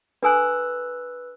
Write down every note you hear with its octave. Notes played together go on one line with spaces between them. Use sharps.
D4 A4 B4 G#5 E6 F#6